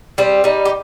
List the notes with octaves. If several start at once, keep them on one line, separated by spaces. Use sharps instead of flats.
G3 C4
G3 D#4
G4